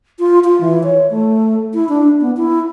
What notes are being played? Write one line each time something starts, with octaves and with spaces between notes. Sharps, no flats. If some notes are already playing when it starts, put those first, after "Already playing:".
F4
F4
E3
C#5
A3
E4
D4
B3
E4